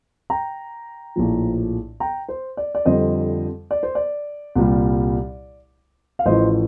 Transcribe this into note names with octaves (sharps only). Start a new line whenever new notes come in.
G5 A#5
A#1 A2 F3
G5 A#5
C5
D5
D5
F2 D3 G3 C5 D#5
D5
C5
D5
C2 A#2 G3
F5
A1 A2 F3 C5 D#5